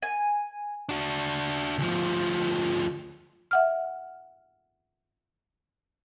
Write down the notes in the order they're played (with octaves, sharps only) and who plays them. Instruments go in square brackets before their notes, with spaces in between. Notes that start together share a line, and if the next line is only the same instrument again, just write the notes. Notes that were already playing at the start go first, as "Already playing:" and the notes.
[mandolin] G#5
[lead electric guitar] D4 F#4
D2 F3
[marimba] E5 F#5 F6